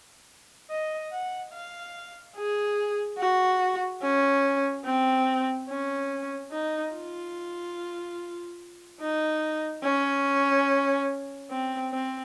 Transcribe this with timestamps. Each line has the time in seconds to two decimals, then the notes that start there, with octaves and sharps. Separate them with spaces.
0.70 D#5
1.11 F#5
1.52 F5
2.36 G#4
3.19 F#4
4.02 C#4
4.85 C4
5.69 C#4
6.52 D#4
6.93 F4
9.01 D#4
9.84 C#4
11.50 C4
11.92 C4